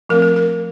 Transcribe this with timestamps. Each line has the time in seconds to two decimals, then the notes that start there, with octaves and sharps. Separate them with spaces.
0.09 F3 A3 C4 A#4
0.22 A#4
0.36 A#4